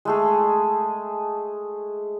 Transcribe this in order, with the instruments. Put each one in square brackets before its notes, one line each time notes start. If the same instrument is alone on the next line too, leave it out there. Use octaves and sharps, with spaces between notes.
[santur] G#3 A3 G#4